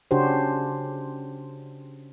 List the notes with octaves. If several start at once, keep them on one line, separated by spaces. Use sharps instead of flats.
C#3 C#4 D4 F#4 G4 C5